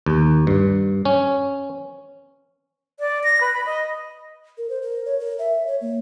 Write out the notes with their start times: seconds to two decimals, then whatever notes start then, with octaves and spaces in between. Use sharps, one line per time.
0.06 D#2
0.47 G2
1.05 C#4
3.00 D5
3.24 A#6
3.41 B4
3.54 B5
3.66 D#5
4.58 A#4
4.70 C5
4.82 A#4
5.06 C#5
5.19 A#4
5.39 E5
5.67 C#5
5.81 A#3